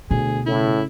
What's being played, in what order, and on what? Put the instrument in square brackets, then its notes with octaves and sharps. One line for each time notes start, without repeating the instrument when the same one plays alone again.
[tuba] D2 [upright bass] B2 [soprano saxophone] G#4
[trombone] A2 [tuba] C#3 [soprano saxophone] E4